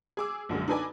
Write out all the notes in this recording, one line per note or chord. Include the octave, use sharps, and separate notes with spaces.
G#4 D6 E6
A#1 F#2 D3 G#3
D4 D#4 A4 B4 G#5 D6